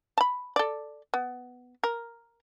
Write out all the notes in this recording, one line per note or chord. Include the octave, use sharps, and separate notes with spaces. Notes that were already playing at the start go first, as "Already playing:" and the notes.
A5 B5
A4 D5
B3
A#4